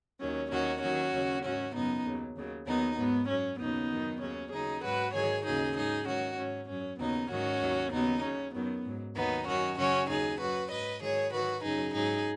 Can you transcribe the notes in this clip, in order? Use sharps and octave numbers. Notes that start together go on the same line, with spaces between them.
D#2 D#3 F#3 C#4
D#2 D#3 F#3 C#4 F#4
D#2 D#3 F#3 C#4 F#4
D#2 C#3 F#3
G#2 D#3 F#3 C#4 F#4
F#2 C#3 F#3 B3 D#4
D#2 C#3 F#3
D#2 C#3 F#3
D#2 D#3 F#3 B3 D#4
G#2 F#3 B3
F#2 F#3 C#4
D#2 C#3 F#3 B3 D#4
F#2 D#3 F#3
D#2 C#3 F#3 C#4
D#2 C#3 F#3 D#4 G#4
G#2 F#3 F#4 B4
G#2 D#3 F#3 G#4 C#5
D#2 C#3 F#3 D#4 G#4
G#2 F#3 D#4 G#4
G#2 D#3 F#3 C#4 F#4
G#2 F#3 C#4
F#2 F#3 C#4
D#2 C#3 F#3 B3 D#4
G#2 D#3 F#3 C#4 F#4
D#2 D#3 F#3
D#2 C#3 F#3 B3 D#4
D#2 C#3 F#3 C#4
F#2 D#3 F#3 B3
G#2 F#3
D#2 D#3 F#3 B3 D#4
F#2 D#3 F#3 C#4 F#4
F#2 C#3 F#3 C#4 F#4
D#2 C#3 F#3 D#4 G#4
F#2 F#3 F#4 B4
G#2 F#3 B4 D#5
G#2 D#3 F#3 G#4 C#5
G#2 D#3 F#3 F#4 B4
F#2 C#3 F#3 D#4 G#4
G#2 F#3 D#4 G#4